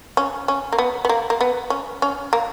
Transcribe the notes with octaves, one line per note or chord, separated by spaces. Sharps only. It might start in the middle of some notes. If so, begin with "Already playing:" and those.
C#4
C#4
A#3
B3
B3
A#3
A#3
B3
C#4
C#4
A#3